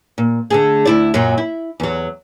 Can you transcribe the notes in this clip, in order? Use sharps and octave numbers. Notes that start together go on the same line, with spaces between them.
A#2
D3 A3 G#4
D2 E4 D5
F#2 A#2 F#3
E4
E2 F#3